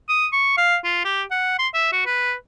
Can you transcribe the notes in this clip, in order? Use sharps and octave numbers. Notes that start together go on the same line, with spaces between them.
D#6
C#6
F5
F4
G4
F#5
C6
E5
F#4
B4